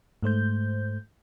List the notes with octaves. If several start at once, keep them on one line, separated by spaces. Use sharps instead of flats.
G#2 A3 C5 G6